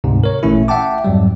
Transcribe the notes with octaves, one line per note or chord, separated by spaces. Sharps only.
D2 G#2 C3
A#4 C#5
A1 A#2 E3 A3 C#4 E4
E5 F#5 G5 A5 D6
F2 G#2 F#3 G3